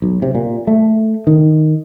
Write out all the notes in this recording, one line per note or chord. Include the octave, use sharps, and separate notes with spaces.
B1
C3
A#2
A3
D#3